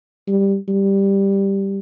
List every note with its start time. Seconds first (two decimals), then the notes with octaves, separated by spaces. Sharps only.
0.28 G3
0.69 G3